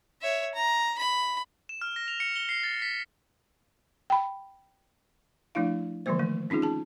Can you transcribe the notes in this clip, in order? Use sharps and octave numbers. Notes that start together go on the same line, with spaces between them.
C#5 E5
A#5
B5
E7
F6
A#6
F7
C#7
G7
C7
A6
B6
G5 B5
F3 A3 D4 E4 F5
D3 E3 F3 G#3 A#3 C5
D#3 A3
C4 C#4 D#4 F4 G#4
G#4 A5